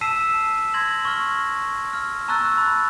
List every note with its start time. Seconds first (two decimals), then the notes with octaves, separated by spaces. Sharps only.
0.01 A5 E6 B6 C7 D#7 E7
0.74 C6 G#6 A#6 F#7
1.05 C#6 F6
1.93 F6
2.28 A5 A#5 C#6 E6 F#6 A6
2.58 B5